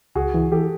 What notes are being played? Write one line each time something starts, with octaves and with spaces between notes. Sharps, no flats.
C#2 F#4 G#4
E3
E3 G4 A4